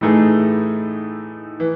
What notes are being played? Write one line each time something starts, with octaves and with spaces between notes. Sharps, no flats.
A2 E3 A3 D#4 G#4
E3